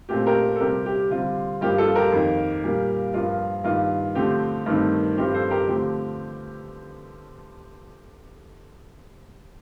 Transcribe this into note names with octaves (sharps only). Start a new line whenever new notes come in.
A#2 A3 C4 G4
G4 A#4
A4
C3 G3 C4 G4 A#4
G4
D3 G3 C4 F4
G2 F3 A#3 G4
F4 A4
G4 A#4
F2 D#3 A#3
A#2 G3 A#3
G2 F3 A#3 F4
G2 D#3 G3 A#3 F4
D3 F3 A3 C4 G4
G2 D#3 A3 C4
G2 F3 C4 G4
A4 C5
G4 A#4
D3 F3 A3 C4 G4